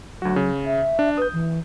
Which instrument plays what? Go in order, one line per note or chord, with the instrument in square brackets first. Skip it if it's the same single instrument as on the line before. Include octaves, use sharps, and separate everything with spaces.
[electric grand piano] D2 F#4 [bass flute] F#3
[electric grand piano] C#3
[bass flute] E5
[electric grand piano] D4
[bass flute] B4 [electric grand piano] D#6 G6
[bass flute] E3